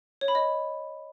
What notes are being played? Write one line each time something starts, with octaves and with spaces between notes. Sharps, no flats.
C#5
B5
D#5